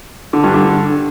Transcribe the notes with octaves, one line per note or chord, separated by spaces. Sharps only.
D3
G2
D3